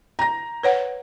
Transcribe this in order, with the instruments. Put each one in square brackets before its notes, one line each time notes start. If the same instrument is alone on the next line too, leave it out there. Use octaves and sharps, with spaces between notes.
[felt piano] A#5 A#6
[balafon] B4 C#5 F#5